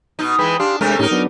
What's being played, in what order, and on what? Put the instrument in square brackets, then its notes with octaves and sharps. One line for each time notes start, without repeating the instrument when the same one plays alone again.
[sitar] B2 D#4
[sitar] E3 G#3 [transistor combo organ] B4 G5 B5
[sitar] D4 [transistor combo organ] G4 F5 C6
[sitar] C3 A3 A#4 [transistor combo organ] G#3 D4
[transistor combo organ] A2 C#4 G4 [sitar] D#4 A#4
[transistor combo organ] F#3 B3 D4